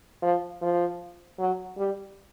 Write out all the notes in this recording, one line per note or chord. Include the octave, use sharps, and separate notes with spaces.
F3
F3
F#3
G3